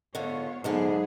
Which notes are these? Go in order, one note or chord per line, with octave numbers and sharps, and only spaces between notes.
G#2 D3 B3 F4 C#5
E2 G#2 D3 F#3 B3 D4 G#4